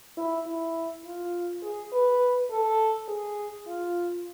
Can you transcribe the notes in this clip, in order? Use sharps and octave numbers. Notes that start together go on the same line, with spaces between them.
E4
E4
F4
G#4
B4
A4
G#4
F4